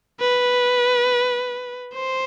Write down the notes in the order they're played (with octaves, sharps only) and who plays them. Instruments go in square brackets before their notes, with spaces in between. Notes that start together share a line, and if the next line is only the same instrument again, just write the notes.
[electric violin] B4
C5